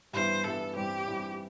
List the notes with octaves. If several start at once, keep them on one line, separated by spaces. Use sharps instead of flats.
G2 E3 B3 E4 C5
G2 E3 B3 E4 A4
G2 E3 G3 C4 G4
G2 E3 G3 C4